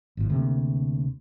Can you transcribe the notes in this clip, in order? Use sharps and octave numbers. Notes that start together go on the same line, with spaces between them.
G#1 A#2
D2 C3 A#3